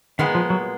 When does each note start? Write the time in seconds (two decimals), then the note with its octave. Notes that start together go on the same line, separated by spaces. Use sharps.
0.19 A#2 D#3 G#3 B3
0.35 F3
0.50 F#3